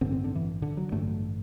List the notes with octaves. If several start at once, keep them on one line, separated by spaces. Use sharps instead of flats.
A1 G2 D3 C4
C4
D3
E3
D3
F#3
A1 G2 D3 A3